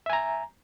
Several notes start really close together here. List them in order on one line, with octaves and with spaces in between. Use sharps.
E5 G#5 A#5